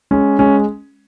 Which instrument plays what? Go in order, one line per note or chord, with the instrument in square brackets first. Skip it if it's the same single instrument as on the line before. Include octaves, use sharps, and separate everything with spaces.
[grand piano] G#3 C#4
G#3 C#4